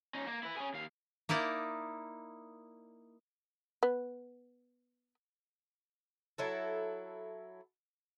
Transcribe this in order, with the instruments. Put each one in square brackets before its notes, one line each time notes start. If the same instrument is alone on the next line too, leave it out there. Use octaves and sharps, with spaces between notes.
[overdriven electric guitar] C#4 D#4
A#3 A#4
E4 B4
C#4 G#4
D#2 F5
[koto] A#3 D#4 E4 D5
[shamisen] B3
[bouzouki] F#3 E4 A4